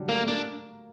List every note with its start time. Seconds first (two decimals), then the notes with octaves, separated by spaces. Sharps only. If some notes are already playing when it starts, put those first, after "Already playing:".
Already playing: D3 F#3 G3 D4 F#4 G4
0.08 A3 A#3 A4
0.28 A#3 D4 A#4